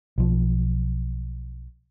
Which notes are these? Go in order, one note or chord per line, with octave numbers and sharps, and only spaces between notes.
B1 F3